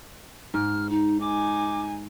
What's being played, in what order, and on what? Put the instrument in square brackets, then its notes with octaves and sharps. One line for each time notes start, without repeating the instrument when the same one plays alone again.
[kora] G#2 [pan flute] F6
[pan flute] D#4
[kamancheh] D#4 G#5 [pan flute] D6